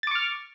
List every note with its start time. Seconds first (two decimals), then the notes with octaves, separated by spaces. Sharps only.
0.03 A6
0.07 D6
0.11 C#6
0.15 F6